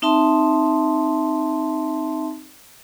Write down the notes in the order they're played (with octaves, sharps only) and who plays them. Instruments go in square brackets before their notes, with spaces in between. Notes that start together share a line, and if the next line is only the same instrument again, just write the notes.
[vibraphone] C4 D#4 E5 A5 C6